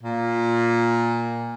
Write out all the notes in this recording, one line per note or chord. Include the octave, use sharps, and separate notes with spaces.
A#2